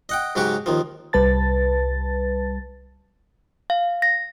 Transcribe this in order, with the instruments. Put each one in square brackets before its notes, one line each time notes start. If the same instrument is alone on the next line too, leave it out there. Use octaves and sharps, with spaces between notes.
[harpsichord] D#5 F#5 G5
G#2 C#3 F#3 C#4 F#4 G4
D#2 D#3 F3
[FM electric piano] C2 G3 B4 A5 A6
[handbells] F5
A#6